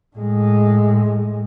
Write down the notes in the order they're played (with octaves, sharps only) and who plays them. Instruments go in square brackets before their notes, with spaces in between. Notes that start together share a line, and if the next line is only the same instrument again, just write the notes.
[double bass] A2 G#3